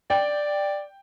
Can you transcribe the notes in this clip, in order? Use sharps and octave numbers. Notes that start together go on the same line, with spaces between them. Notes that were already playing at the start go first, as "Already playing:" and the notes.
D5 G5